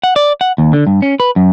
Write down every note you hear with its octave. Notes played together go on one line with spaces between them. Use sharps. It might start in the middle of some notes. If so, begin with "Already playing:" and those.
F#5
D5
F#5
D#2
D3
G2
C#4
B4
F#2